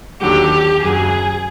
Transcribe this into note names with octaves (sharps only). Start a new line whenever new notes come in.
D#2 D3 F#3 G4
F#2 C#3 F#3 G#4